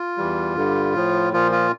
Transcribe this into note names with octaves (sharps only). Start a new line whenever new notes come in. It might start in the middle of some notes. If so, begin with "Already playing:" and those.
Already playing: F4
E2 E3 G3
G2 D3 G3
A2 F3
A#2 F3 F4
F4